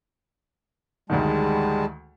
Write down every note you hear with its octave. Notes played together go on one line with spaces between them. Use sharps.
D2 G#2 D#3 G3 G#3 A5